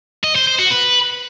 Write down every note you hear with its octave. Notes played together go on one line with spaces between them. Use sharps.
D#5
C5
C5
F#4
B4